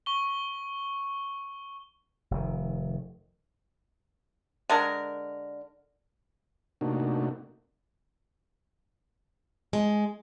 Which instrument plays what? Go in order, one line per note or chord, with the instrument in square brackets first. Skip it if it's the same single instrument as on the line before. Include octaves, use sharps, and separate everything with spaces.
[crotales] C#6 G7
[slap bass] F1 D#3
[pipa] D3 G#3 A#4
[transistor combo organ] C3 A3 A#3 D4 D#4 F#4
[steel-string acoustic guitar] G#3